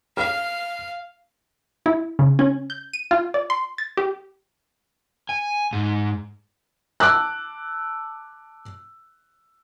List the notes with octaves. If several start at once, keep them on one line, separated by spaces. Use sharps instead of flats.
F5 F6
E4
C#3
C#4
G6
D#7
F4
D5
C6
A6
G4
G#5
G#2
A5 D6 E6 F#6